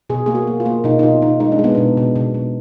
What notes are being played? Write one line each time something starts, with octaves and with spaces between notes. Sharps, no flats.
B2 G#4
A#3 G#4
F#4
A#3
F4
A#3
B2 D#4
D#4
B2 F4
B2 D#4
G#3 D#4
D4
G#3
B3
B2 D4
B2
B2
B2